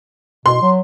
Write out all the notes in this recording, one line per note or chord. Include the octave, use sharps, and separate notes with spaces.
B2 C6
F#3